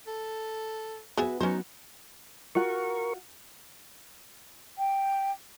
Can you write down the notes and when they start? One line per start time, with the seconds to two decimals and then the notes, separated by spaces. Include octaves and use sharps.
0.07 A4
1.17 B3 F#4 G#4 B4 E5
1.40 F#3 B3 C#4 D#4 F#4 C5
2.55 F4 F#4 A#4 F#5 C#6
4.78 G5